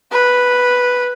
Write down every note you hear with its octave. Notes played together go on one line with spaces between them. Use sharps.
B4